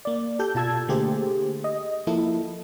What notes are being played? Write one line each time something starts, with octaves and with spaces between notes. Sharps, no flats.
A#3 D5
G4 A4 G6
B2 F4 A5 E6 G#6
D3 A3 A#3 G4 G#4 C5
D#5
F3 A#3 E4 A4